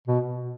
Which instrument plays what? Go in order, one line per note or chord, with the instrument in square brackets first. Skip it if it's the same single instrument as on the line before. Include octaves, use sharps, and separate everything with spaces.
[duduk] B2